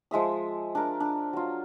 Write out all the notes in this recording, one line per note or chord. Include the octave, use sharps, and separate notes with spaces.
F3 G#3 E5 D#6
D4 A#4
D4
F#3 F4